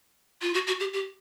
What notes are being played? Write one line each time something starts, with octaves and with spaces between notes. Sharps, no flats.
F4
F#4
F#4
G4
G4